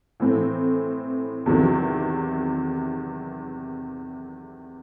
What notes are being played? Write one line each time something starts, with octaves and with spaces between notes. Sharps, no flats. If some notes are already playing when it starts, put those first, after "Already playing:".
A2 E3 C4
E2 C3 D#3 F#3